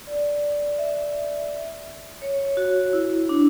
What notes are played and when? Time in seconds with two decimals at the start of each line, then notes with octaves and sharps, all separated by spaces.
0.07 D5
0.78 E5
2.22 C#5
2.57 F#4
2.93 E4
3.29 D4